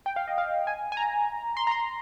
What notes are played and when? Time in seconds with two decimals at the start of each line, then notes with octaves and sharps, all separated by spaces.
0.06 G5
0.16 F5
0.27 D#5
0.38 F5
0.67 G#5
0.92 G#5
0.97 A#5
1.57 C6
1.67 A#5
1.71 C6